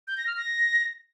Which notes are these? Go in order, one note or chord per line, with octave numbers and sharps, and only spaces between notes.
G6
A#6
F6
A#6